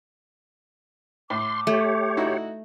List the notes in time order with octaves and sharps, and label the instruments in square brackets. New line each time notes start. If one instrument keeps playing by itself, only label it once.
[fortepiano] A2 [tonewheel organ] C6 [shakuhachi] D6
[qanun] A3 [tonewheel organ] G4 C#5
[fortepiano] D#4 E4 F#4